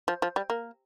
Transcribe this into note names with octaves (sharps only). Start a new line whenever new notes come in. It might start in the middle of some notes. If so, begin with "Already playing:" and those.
F3
F3
G3
A#3